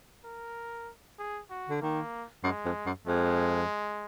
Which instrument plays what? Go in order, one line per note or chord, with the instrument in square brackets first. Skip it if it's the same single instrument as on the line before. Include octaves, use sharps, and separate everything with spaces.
[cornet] A#4
G#4
F#4
[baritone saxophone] D3
[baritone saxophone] D#3 [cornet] A#3
[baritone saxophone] F#2 [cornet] G#3
[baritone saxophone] F2
F#2
[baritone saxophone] F2 [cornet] G#3